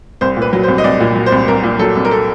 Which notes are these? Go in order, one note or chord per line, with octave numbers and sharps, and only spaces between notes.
C2 C5
A#2 B4
F#3
C5
C2
D#5
C2 D5
A#2
F#3
C5
C2
C2 A#4
A#2
F#3 A4
C2
A#4
A4